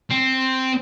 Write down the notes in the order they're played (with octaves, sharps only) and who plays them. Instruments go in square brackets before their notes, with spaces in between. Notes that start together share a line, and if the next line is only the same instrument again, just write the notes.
[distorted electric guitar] C4